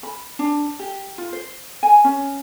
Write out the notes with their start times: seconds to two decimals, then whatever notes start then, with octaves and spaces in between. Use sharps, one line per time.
0.03 B5
0.39 D4
0.79 G4
1.18 F4
1.32 C5
1.83 G#5
2.04 C#4